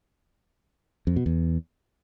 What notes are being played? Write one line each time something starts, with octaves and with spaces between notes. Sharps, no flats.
F2
B2
E2